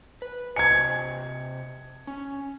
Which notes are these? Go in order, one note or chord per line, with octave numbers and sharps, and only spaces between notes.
B4
C3 D#5 G#5 G#6 C#7
C#4